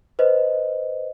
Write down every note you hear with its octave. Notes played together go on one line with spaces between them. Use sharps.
B4 C5 D#5